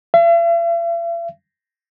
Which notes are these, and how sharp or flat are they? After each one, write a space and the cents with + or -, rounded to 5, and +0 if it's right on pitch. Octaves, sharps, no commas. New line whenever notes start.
E5 +45